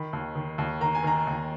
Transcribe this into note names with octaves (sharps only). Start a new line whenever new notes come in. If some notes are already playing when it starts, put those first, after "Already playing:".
Already playing: D#3 B5
D#2
D#3
D#2
D#3 A#5
G#5
D#3 A#5
D#2